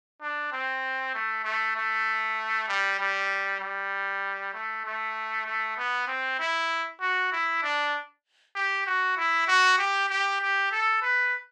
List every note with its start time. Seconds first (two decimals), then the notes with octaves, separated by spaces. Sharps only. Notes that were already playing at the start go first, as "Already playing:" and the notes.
0.21 D4
0.52 C4
1.14 A3
1.44 A3
1.76 A3
2.68 G3
2.99 G3
3.60 G3
4.54 A3
4.84 A3
5.46 A3
5.77 B3
6.07 C4
6.39 E4
7.01 F#4
7.32 E4
7.62 D4
8.55 G4
8.86 F#4
9.17 E4
9.47 F#4
9.78 G4
10.09 G4
10.41 G4
10.72 A4
11.02 B4